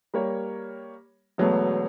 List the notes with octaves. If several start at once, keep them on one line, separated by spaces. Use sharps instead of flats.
G3 A#3 A#4 C#5
E1 F#3 A3 B3